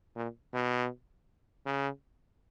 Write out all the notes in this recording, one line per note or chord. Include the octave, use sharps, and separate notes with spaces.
A#2
B2
C#3